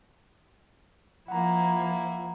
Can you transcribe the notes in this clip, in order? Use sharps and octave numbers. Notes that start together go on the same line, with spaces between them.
F3 A#3 E4 F#5 A#5